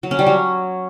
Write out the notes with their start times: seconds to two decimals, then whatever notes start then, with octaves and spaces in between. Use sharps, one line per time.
0.03 F#3
0.11 C#4
0.19 G3
0.26 F#3